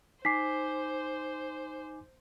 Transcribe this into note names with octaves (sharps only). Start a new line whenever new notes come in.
D#4 C5 G#5 D6 B6 C7